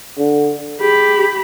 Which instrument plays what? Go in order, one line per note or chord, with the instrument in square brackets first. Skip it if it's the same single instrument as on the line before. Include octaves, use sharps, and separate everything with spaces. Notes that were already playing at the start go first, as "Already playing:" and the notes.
[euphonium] D3
[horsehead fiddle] G4 B5 [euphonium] G#4